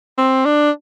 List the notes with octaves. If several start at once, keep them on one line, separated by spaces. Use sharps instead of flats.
C4
D4